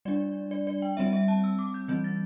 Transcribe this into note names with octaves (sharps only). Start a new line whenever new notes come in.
G3 D4 D5
D5
D5
G5
G3 C4 E5
E5
A5
E6
D6
G6
E3 G3 C4 G6
A6